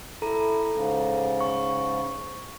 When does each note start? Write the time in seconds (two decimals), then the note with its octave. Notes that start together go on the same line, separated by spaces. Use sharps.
0.22 E4 A4 A#5
0.73 G#2 C#3
1.41 C#6